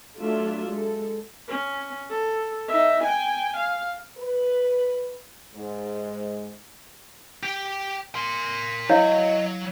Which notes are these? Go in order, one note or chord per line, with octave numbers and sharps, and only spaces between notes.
F#3 A3 D4 F4 E5
G#3 A4
C#4
A4
D#4 E5
G5 G#5
F5
B4
G#2
G4 G5
A#4 C6
F#3 E4 C#5 D#5 F5